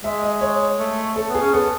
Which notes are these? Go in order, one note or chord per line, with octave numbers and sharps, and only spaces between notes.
G#3 E5
D#5
C#5
A3
A4
B3
G#4
C#4
B3 A4